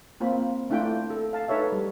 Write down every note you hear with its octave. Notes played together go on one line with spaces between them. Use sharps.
A#3 C4 F4 B5
A3 D4 E4 F4 G5
A4
F5 A5
D#4 A4 B4 C#5 E5
G3